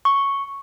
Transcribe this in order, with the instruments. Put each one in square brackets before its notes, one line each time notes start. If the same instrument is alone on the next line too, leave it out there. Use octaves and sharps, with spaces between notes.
[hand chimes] C#6